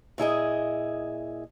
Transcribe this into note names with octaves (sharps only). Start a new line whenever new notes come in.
A#2 E4 G#4 D#5